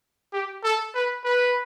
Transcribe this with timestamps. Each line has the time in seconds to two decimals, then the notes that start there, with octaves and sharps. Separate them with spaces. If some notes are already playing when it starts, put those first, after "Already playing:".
0.33 G4
0.64 A4
0.94 B4
1.25 B4